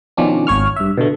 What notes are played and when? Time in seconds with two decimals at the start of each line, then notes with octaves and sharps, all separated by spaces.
0.17 B2 D#3 F3 C#4 D4
0.47 G#1 C#5 C#6 F6
0.76 G2 E5
0.97 B2 D3 A3